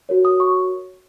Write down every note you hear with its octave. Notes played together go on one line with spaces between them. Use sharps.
F#4 A#4 C#5
D#6
C#6